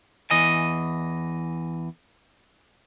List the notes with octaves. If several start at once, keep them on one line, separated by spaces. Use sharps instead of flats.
E2 E3 D#5 G#5